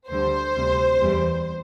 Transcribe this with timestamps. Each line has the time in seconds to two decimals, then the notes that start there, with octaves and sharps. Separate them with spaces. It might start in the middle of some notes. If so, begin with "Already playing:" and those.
0.09 D2 D3 G3 C5
0.55 D2 C3 G3
1.00 E2 E3 G3